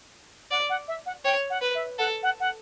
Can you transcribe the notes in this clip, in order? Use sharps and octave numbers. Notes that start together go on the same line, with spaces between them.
D5 F#5
F#5
E5
F#5
C#5 G5
F#5
B4
E5
A4 F#5
F#5
F#5